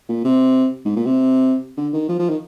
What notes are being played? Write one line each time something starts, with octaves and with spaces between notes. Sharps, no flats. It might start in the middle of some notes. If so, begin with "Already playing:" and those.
A#2
C3
G#2
A#2
C3
D3
D#3
F3
F3
D#3